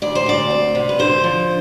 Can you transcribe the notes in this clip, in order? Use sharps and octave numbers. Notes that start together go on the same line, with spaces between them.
D2 D5
C5
D2 D5
C4
C3
B4
D3 C5
F3